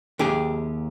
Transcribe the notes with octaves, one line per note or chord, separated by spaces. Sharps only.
D#2 G4 G#4